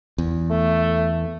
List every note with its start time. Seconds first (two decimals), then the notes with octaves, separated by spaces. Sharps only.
0.18 E2
0.51 A3